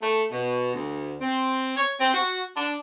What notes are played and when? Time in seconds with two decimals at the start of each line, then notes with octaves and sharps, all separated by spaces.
0.02 A3
0.30 B2
0.73 D2
1.20 C4
1.76 C#5
1.99 C4
2.12 F#4
2.56 D4